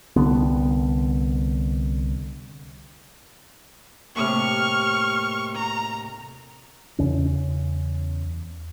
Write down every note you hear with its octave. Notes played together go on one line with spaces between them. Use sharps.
C2 D3 B3
D#2 A2 C3 C#6 F6
A#5
E2 C#3 C#4